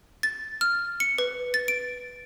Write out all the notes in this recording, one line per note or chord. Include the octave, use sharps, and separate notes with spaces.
A6
F6
C#7
B4
A6
D7